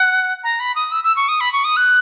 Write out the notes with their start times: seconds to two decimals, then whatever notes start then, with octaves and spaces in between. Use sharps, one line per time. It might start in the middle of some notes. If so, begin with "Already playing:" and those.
Already playing: F#5
0.44 A#5
0.60 B5
0.76 D#6
0.92 E6
1.04 E6
1.16 C#6
1.29 D#6
1.41 B5
1.53 C#6
1.64 D#6
1.77 F#6